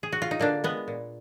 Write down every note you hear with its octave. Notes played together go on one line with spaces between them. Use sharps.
G#4
F#4
F4
D#4
D3 A#3 D4
G#3 B3
A#2